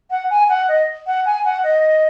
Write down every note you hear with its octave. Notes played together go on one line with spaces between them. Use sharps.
F#5
G#5
F#5
D#5
F#5
G#5
F#5
D#5